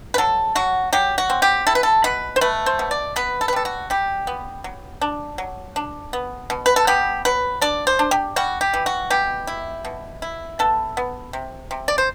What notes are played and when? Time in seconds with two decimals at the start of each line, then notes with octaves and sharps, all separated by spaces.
0.14 B4
0.18 F#3 A4
0.55 F#3 F#4
0.93 F#3 G4
1.18 F#4
1.30 C4
1.42 G4
1.67 E4 A4
1.75 B4
1.83 A4
2.04 B2 B4
2.36 C5
2.41 A3 B4
2.66 C5
2.79 B2
2.91 D5
3.16 B3 B4
3.41 A4
3.48 B4
3.53 G3 A4
3.65 F#4
3.90 G3 G4
4.27 B3
4.64 F#3
5.01 D4
5.38 F#3
5.76 D4
6.13 B3
6.50 B2
6.66 B4
6.76 A4
6.87 B3 G4
7.25 F#3 B4
7.61 D4 D5
7.87 C5
7.99 D4
8.11 G4
8.36 G3 F#4
8.61 G4
8.73 E3
8.86 F#4
9.10 B2 G4
9.47 E4
9.85 B2
10.22 E4
10.59 B3 A4
10.97 B3
11.33 C3
11.71 C3
11.88 D5
11.98 C5